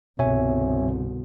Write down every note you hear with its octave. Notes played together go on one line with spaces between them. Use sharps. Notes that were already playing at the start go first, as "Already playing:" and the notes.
G1 C2 B2 C4 C#5 E5 G#5